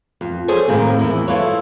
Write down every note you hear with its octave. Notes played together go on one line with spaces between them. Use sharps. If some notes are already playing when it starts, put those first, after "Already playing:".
F2
G#4 A4 C5 C#5 G#5
A2 D#3 G#3 A#3 C4
E2 E4
E4 F4 A4 B4 C#5